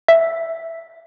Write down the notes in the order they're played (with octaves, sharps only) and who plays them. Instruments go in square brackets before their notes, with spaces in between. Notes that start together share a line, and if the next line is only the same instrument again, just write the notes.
[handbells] E5